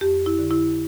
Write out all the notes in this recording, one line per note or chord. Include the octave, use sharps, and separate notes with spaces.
F2 G4
E4
D3
E4